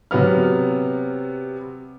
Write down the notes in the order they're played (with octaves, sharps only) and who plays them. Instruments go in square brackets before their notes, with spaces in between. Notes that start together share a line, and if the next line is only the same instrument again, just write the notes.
[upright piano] C3 F#3 B3 F6